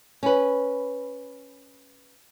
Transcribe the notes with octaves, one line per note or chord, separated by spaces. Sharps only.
C#4 B4